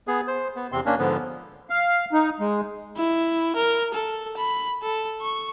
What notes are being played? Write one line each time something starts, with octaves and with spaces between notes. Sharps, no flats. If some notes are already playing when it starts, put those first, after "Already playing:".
B3 G#4
C5
B3
E2 C3 C4 C6
A#3 C#4 D4
G#2 D3 F3 B3
F5
D#4
G#3
E4
A#4
A4
B5
A4
C#6